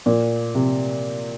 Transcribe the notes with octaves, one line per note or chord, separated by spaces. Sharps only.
A#2
C3